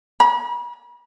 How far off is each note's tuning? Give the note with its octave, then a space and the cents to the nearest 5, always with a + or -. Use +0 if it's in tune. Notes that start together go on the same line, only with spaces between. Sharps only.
B5 -45